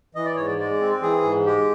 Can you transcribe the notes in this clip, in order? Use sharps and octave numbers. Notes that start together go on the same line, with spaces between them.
E3 D#5
D5
G#2 C#5
D5
G#3 D5
C4
E3 G#4
G#2
G#3 G4